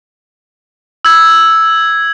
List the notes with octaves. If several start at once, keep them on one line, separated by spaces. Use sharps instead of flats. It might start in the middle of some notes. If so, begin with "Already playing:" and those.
E6 G#6